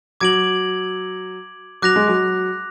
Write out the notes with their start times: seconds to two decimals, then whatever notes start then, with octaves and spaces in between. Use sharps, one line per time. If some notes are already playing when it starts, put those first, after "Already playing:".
0.21 F#3 D6 G#6 D7 F#7
1.82 F#3 D6 F#6 A#6 F7
1.96 G#3
2.08 F#3